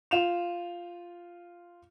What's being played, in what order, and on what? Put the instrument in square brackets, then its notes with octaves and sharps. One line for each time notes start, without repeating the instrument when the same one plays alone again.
[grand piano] F4 E7 F7